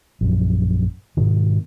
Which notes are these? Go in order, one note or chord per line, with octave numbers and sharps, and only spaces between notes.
A#1 F#2
G#2 B2 D#3